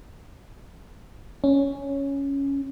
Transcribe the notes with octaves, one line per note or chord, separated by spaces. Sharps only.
C#4